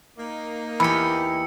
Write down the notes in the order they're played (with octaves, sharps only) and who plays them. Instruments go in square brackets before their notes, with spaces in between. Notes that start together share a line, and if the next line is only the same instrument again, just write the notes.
[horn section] A#3 D#4
[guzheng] E2 G4 [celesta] B5 [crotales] E6 C#7